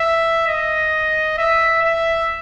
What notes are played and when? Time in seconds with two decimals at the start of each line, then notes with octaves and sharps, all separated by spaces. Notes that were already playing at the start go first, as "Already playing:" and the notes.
Already playing: E5
0.47 D#5
1.38 E5
1.82 E5